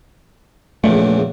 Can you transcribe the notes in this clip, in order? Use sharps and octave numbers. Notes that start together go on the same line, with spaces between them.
A#1 E2 C#3 A3